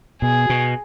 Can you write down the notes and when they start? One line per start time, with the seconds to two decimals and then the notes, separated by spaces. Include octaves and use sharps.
0.22 B2 G#4
0.50 B2